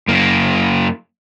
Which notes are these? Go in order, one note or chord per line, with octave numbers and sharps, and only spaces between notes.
F#2 A#3